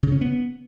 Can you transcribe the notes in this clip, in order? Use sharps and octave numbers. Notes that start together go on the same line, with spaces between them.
C#3
C#4
B3